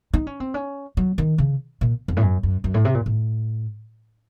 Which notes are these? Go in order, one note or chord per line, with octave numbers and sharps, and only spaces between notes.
D#4
C#4
C4
C#4
F#3
D#3
C#3
A#2
F2
A2
F#2
F#2
F#2
A2
C3
A#2
A2